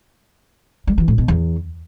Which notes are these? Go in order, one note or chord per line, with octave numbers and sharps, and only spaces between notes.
G3
E3
A2
B2
E2